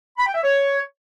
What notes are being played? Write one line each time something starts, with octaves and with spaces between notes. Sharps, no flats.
B5
G5
E5
C#5